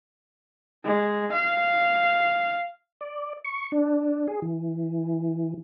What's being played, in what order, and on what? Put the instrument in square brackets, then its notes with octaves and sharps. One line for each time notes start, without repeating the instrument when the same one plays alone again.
[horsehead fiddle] G#3
F5
[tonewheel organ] D5
C#6
D4
G#4
E3